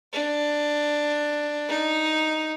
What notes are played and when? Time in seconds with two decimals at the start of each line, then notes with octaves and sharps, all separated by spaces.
0.13 D4
1.69 D#4